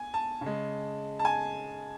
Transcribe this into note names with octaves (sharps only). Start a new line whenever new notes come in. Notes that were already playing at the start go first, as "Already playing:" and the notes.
Already playing: G#5
A5
C#3
G#3
A5
G#5